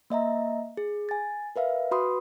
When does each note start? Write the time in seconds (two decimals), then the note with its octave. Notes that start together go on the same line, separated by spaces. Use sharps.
0.10 A#3 D#5 E5 A#5
0.77 G#4
1.09 G#5 A6
1.56 A#4 B4 E5 F5
1.91 F#4 B4 B5 C6 D#6